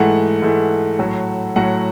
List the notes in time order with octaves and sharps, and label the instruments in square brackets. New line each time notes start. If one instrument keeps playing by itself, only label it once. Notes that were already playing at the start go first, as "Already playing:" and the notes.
Already playing: [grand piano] G#2 E3 A3 F#5
G#2 E3 A3
A2 F#3 A3
A2 F#3 A3 F#5